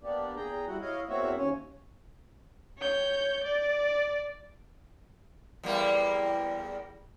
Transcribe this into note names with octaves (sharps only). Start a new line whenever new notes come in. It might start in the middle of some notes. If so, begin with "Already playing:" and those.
A#3 B3 D4 G4 D5
E2 G#4 G5 A#5
G3 E4 F#4 F#5
E4 C#5 D#5 F5
E2 A#3 C4 F#4 C#5 E5
D#2 C#4 C#5
C#5 G6
D5
E2 G3 A#3